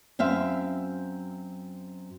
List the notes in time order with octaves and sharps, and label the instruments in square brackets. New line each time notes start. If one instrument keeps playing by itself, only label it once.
[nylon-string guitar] F#2 C4 E5 F5